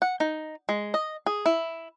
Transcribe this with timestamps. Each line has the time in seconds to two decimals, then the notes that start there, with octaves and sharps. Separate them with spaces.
0.02 F#5
0.20 D#4
0.69 G#3
0.94 D#5
1.26 G#4
1.46 E4